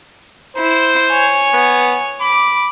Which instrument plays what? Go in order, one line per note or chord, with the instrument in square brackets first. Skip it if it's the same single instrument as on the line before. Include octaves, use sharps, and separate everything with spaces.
[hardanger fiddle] E4 [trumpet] C5
[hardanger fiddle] C#5 G#5
[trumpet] B3
[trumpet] B5 [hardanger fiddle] D6